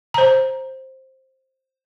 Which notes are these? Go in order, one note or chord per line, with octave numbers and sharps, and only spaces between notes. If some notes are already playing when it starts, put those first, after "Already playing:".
C5 A#5